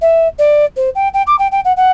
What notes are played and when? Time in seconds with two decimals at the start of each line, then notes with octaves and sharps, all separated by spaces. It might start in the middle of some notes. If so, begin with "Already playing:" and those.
0.01 E5
0.38 D5
0.76 C5
0.95 G5
1.14 G5
1.27 D6
1.39 G5
1.51 G5
1.64 F#5
1.76 F#5